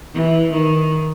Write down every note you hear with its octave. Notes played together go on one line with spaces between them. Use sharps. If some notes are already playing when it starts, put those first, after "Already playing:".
E3
D#3